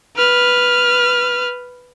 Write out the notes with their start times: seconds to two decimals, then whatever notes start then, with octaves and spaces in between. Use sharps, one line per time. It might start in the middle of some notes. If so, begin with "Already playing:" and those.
0.16 B4 F6